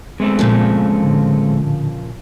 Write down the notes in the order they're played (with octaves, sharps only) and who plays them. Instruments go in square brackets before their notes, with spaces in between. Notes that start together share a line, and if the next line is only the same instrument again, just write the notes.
[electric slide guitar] G#3 A3 C4 [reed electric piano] B3
[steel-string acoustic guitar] A#2 C#3 F3
[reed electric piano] A2 D3 A5